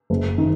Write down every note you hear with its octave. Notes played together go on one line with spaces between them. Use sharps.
F#1
D#3